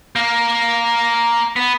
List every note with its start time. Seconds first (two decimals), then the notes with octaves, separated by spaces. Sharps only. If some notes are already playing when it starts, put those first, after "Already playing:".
0.16 A#3
1.56 B3